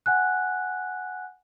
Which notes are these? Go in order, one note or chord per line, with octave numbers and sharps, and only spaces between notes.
F#5 G#5 F#6